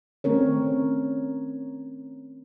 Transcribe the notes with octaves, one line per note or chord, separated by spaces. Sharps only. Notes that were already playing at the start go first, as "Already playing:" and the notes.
D#3 A3 C4 C#4 A#4 C#5